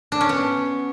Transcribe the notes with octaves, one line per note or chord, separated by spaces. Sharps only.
D4
C#4
B3